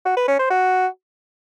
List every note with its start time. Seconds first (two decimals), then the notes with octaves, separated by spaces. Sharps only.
0.05 F#4
0.17 B4
0.28 C#4
0.39 C5
0.50 F#4